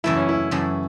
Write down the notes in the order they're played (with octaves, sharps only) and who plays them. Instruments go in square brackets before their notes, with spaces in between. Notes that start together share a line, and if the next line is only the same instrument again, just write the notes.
[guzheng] F#2 C#3 E3 A3 [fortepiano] E4
[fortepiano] C#4
E4
[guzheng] F#2 C#3 E3 A3